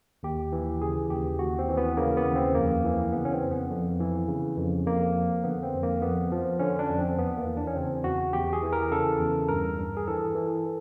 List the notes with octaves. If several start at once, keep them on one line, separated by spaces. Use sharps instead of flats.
D#2 G4
E3
C#3 G#4
D#2 G4
D#2 F#4
C4
E3
B3
C#3 A#3
B3
D#2
C4
F2 A#3
E3
C#3 B3
C#4
C4
F2
B3
F2
E3
C#3
F2
F2 A#3
F3
D3 B3
C4
F2
A#3
F2 B3
F3
D3 C#4
D4
F2
C4
E2 B3
A#3
E3
D4
C#4
C#3 C4
E2 F#4
E2 G4
G#4
E3
A#4
C#3 A4
E2
G2 A#4
G2
G#4
E3 A4
E3